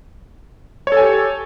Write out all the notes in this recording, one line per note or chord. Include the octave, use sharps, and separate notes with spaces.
G4 A4 C#5 G#5